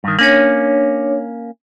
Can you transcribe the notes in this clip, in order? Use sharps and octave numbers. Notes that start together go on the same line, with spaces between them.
G2 D#3
A#3 C#4 D4 C#5